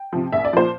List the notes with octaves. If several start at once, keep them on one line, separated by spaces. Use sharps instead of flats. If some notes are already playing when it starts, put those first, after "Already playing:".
Already playing: G5
C3 F3
A#1 E5
D5
A#2 F3 C5